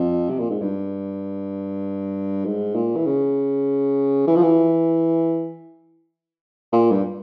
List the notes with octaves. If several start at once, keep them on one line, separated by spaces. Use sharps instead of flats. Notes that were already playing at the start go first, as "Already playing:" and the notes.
Already playing: F2
C3
A#2
G#2
G2
G#2
A#2
E3
C#3
E3
F3
E3
A#2
G2